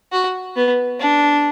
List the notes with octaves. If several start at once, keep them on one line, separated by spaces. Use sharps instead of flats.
F#4
B3
D4